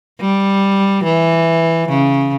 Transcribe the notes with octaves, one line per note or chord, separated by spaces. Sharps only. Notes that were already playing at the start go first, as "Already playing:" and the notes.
G3
E3
C#3